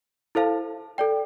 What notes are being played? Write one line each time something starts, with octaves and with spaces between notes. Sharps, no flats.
E4 A4 C5 F5 A5
A4 D5 G5